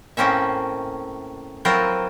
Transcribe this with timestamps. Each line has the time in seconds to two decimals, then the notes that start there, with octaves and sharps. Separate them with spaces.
0.17 A2 A#3 C4 C#4 E5
1.65 F#3 C4 E4 F4 A#4